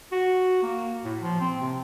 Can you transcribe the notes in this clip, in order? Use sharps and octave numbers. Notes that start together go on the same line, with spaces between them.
F#4
A#3
A2
F3
C4
C3